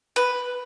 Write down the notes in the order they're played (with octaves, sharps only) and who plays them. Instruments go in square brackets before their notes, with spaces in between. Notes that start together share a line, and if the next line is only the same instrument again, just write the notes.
[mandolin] B4